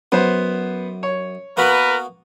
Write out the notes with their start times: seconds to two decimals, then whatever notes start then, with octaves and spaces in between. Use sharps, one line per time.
0.12 F#2 B3 C5
1.03 C#5
1.57 A#3 B3 F#4 A#4 B4